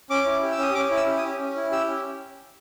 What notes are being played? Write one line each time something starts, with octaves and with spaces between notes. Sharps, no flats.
C#4 D6
E4
G4
E6
C#4 D#6
C#4 D6
E4
E6
G4
D#6
C#4
C#4
E4
G4 E6
C#4